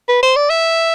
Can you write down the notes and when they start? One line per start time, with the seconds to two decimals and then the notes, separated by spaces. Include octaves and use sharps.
0.09 B4
0.23 C5
0.36 D5
0.50 E5